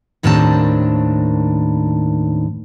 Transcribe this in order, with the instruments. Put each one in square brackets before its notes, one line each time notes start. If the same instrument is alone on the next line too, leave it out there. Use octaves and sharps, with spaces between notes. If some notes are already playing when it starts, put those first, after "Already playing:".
[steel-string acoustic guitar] D#2 A2 D#3 C4 D4 A5